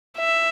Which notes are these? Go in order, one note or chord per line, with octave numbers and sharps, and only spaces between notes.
E5